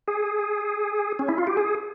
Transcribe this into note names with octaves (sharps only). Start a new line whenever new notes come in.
G#4
C#4
E4
F4
G4
G#4